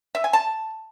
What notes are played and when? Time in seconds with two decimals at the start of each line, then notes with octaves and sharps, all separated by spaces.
0.15 E5
0.24 G#5
0.33 A5